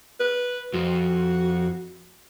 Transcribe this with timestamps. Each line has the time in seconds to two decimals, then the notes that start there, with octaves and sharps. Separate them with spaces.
0.20 B4
0.74 F2 F3 F#4